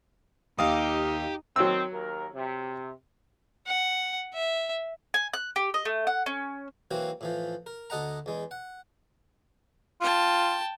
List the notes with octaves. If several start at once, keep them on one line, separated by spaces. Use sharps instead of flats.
D#2 D#4 G4 F5 D#6
D#3 F#3 C4 E6
D#2 A#4
C3
F#5
E5
G#5
F#6
G4
D#5
A3
F#5
C#4
E3 F#3 A#3 C4 F#4
A2 E3 F3
A#4
D2 A4 D#5 F#5 A#5
E2 G#3
F#5
F4 G5 A5